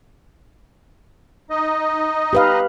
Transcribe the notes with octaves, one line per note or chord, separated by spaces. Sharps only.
D#4 D#5
G4 B4 F5